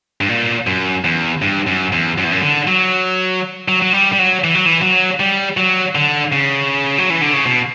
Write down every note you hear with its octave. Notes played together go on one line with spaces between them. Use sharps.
G2
A#2
F#2
E2
G2
F#2
E2
F#2
E2
F#2
D3
F#3
F#3
F#3
G3
G3
F#3
E3
F#3
E3
F#3
G3
F#3
D3
C#3
F#3
E3
D3
C#3
B2